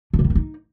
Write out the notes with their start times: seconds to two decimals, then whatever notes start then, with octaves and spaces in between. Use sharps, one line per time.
0.13 D3
0.19 C3
0.24 D#3
0.30 A3
0.35 D#4